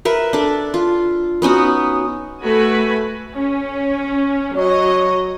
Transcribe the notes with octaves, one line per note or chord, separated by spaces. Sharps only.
A#4 B4 E5
D4 A4
F4
B3 C#4 D#4 F#4
A3 F#4 A4 B4 G#5 B5
C#4
F#3 C#5 D#5